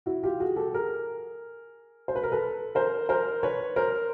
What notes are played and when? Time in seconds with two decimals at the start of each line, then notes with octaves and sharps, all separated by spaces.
0.06 E4 F#4
0.23 F4 G4
0.40 F#4 G#4
0.56 G4 A4
0.73 G#4 A#4
2.08 C5
2.16 B4
2.23 A#4
2.32 A4 B4
2.75 A#4 C5
3.09 A#4 C5
3.43 B4 C#5
3.76 A#4 C5